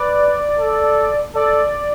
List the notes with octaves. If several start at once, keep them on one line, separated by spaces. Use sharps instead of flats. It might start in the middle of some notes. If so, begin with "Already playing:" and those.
Already playing: B4 D5
A4
A4 D5